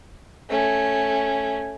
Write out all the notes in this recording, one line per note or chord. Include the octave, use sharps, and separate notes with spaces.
A3 C#4